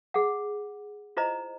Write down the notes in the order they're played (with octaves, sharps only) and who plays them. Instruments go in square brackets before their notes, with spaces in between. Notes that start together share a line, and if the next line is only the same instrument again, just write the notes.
[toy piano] G#4 F#5
E4 F4 C5 D#5 A#5